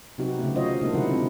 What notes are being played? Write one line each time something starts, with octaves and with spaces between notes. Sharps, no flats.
C3 F#3 B3 D#4 F#4 G4
C#3 A3
D#3 F#3 F4 C5 C#5 D#5
C3 G#3 A#3 D4 D#4
B2 D3 F3 G#3 E4 F#5
D#3 C4